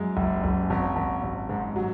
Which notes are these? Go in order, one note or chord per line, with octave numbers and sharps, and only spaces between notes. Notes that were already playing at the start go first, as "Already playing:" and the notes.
Already playing: F#2 G#3
F#1
F#1
G#1
G#1
G#1
G#2
F#3